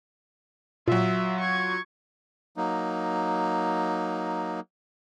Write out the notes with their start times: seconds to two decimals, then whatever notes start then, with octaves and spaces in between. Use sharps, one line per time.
0.88 A#2 F#3 F4 E5
1.40 C#6 G#6
2.57 F#3 A#3 D#4